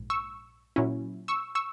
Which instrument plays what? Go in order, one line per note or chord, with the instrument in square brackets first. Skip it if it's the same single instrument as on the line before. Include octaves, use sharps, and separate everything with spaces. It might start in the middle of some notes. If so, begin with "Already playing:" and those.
Already playing: [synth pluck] A#1 G#2
C#6 E6
A#2 F#3 C#4 E4
C#6 E6
C#6 E6